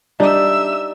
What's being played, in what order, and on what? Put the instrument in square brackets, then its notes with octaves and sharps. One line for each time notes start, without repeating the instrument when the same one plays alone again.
[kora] G3 D#4 [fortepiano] D4 [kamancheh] E5 E6